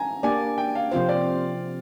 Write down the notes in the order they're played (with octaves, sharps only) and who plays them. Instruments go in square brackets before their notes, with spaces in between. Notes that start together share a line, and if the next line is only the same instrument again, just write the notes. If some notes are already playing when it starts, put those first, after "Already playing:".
Already playing: [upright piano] G#5 A#5
[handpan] A#3 D4 G4 D5 [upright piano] G#5
[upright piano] G5
F5
[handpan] C3 F3 C4 F4 C5 [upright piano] F5
[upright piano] D5